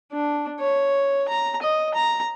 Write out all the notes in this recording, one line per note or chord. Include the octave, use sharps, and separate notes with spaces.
D4
C#5
A#5
D#5
A#5